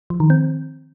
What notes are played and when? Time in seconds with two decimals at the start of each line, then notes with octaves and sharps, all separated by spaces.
0.10 F3
0.20 D#3
0.30 C4